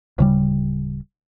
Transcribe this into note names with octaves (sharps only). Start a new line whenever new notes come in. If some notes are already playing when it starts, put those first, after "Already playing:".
D1 C#3 G3